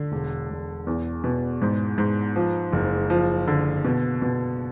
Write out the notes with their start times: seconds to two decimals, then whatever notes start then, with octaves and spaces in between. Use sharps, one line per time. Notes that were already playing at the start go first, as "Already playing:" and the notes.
Already playing: D3
0.12 E1
0.50 E1
0.87 E2
1.24 B2
1.62 G#2
1.98 G#2
2.36 F3
2.73 F#1
3.10 F3
3.48 D3
3.85 B2
4.22 B2